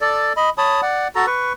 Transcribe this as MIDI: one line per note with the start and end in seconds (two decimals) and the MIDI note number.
0.01 0.33 69
0.01 0.33 74
0.37 0.50 75
0.37 0.50 83
0.58 0.81 73
0.58 0.81 81
0.58 0.81 83
0.58 0.81 87
0.82 1.08 74
0.82 1.08 78
1.15 1.26 66
1.15 1.26 69
1.15 1.26 82
1.27 1.53 71
1.27 1.53 85